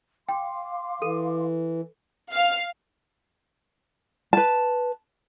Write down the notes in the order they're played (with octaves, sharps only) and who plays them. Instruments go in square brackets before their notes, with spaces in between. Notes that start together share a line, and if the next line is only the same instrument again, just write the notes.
[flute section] F5 C6 D6 [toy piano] G5
[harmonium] E3 [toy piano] A4
[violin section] F5
[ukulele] B4 A5